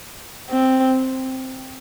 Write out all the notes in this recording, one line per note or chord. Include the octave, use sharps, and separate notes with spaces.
C4